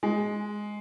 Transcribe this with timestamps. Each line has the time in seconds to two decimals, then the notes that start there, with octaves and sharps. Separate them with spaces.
0.03 G#3